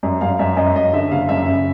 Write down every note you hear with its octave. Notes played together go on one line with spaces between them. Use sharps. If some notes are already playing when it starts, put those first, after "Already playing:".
F#2
F#2 F5
F#2 E5
F#2 D#5
F#2 D#5
D3 E5
F#1 F5
F#2 E5
C#3